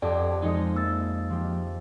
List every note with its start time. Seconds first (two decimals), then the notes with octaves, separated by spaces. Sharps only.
0.02 F2 G4 A4 D5 G5
0.42 F3 G#3 D#4 D#5 C#7
0.76 A#3 E6 A6
1.30 F3 G4